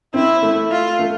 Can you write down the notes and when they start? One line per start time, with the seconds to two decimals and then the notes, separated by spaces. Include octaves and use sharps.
0.14 C4 E4
0.42 A3
0.71 F4
0.99 A3